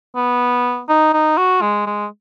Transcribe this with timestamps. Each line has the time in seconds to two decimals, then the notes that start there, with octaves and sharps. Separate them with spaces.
0.16 B3
0.89 D#4
1.13 D#4
1.38 F#4
1.61 G#3
1.86 G#3